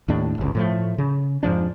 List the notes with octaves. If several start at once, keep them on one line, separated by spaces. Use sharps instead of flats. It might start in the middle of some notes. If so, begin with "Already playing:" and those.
D#2 A2 D4
G1 C#2
A2 F3 A3
C#3
F2 G#2 F3 D4